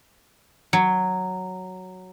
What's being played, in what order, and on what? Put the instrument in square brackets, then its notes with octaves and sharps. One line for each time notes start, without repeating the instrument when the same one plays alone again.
[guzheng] F#3